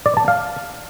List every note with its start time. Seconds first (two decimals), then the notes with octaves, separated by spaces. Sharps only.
0.06 D5
0.17 A5
0.28 F5